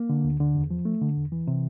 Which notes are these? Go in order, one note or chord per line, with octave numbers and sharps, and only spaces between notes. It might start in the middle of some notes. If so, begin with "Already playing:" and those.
Already playing: A#3
D3
D2
D3
E2
F3
A3
D3
E2
E3
C3